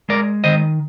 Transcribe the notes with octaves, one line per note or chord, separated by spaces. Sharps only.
G#3 A#4 D5
D#3 C5 D#5